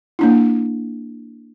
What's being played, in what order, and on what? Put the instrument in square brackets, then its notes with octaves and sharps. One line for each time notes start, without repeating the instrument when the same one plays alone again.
[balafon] A#3 D4 E4